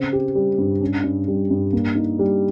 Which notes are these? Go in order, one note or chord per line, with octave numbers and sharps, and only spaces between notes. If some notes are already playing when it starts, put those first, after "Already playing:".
Already playing: C#3 C4
G4
G3
G2
C#4
G2
G3
G2
A#3
D#4
G3